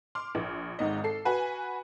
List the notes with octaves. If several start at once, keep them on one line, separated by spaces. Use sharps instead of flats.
C6 D6 F6
A#1
G#1 G#2 D#5
A4 C7
F#4 B4 G#5